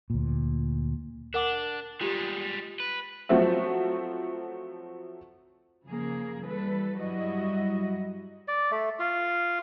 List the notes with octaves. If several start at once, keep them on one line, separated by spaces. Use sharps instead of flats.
D2 A#2
D4 A#4 F#5 D6
G3 G#3 F4 G4
B4
F3 F#3 A3 C4 F#4 E5
C#3 F3 A#3 G#4
E3 G3 A4 B4
G2 F#3 G3 E4 F#4 D#5
D5
A3
F4